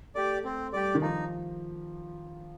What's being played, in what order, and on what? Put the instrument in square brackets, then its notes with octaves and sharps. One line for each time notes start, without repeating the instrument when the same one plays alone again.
[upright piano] A3 [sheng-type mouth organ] G4 D5
[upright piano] A3 [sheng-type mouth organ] C4
[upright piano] G3 [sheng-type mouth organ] G4 D5
[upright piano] D#3
[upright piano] F3 [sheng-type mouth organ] D#4